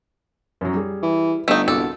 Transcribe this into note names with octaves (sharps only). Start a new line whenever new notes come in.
F#2 F#3
G3 G#4
E3
G1 A3 D#4
C2 F#4 A4 D6